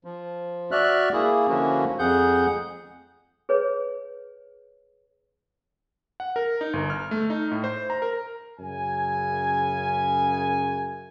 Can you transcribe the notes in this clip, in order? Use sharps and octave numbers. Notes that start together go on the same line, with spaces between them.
F3
F#4 D5 E5 F6 F#6
A#3 E4 G#4
D3 F3 A#3 C#4 E4 F#4
F2 G#4 F#5 G6
G#4 B4 C#5
F#5
A#4
D#4
G1
F6
A3
D#4
A2
C5
A#5
A#4
F#2 C#3 G#5